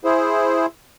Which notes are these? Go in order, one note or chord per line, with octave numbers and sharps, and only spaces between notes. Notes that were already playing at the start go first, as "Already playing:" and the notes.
E4 G#4 C5